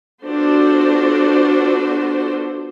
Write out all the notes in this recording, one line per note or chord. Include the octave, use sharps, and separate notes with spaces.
B3 D4 F4 F#4 A4 C5